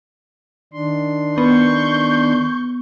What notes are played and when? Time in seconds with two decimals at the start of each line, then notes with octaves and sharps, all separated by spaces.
0.73 D#3 D4 C6
1.38 B3 C#6 G6